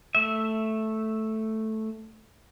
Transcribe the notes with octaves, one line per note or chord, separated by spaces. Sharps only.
A3 E5